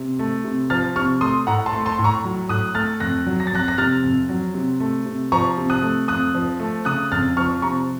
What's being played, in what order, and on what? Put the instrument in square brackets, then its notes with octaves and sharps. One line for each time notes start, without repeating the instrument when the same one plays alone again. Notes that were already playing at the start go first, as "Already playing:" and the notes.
Already playing: [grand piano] C3
A3
C3
F3 F6 A6
C3 C#6 F6
A3 C6 D#6
A2 F#5 A#5
A5 C6
A3
A5 C6
A2
A#5 C#6
F#3
A2 D#6 F#6
A3 F6 A6
F2 F#6 A#6
F#3
A#6
A6
F2 F#6 A#6
A#6
C3 F6 A6
F2
F#3
C3
A3
C3
F3 A#5 C#6
C3
D#6 F#6
A3
F2 D#6 F#6
F3
A3
C#3 D#6 F#6
F2 F6 A6
F3 C#6 F6
C3 A#5 C#6